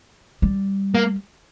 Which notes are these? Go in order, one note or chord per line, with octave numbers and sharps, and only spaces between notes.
G3
A#3